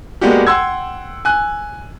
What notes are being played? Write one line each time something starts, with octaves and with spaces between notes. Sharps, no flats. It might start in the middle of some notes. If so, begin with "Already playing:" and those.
G#3 A#3 B3 D4 F#4 G4
F#5 G5 C6 E6 G#6
G#5 F#6